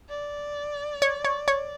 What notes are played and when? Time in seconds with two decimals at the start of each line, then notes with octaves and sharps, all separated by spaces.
0.10 D5
1.02 C#5
1.25 C#5
1.48 C#5